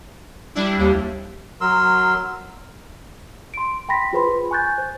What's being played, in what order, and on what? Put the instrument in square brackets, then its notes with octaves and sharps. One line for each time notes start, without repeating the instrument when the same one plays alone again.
[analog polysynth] G3 D4 E4
[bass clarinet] D#2 [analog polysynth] G3
[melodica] F#3 A#4 C6 E6
[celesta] C6 D7
G5 B5 C6 A#6 B6
F4 G#4 B4 C5 B5 C6
G#5 C#6 F#6 G6 A6
C5